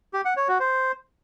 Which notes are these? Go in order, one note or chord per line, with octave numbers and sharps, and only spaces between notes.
G4
F#5
C#5
F#4
C5